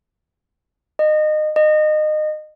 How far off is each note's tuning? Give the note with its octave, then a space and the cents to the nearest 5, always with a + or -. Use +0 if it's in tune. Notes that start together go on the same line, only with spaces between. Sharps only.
D#5 -25
D#5 -25